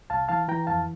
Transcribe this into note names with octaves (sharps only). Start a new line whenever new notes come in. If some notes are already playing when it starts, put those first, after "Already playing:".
C2 F5 A5
E3 F5 A5
E3 G5 A#5
F2 F5 A5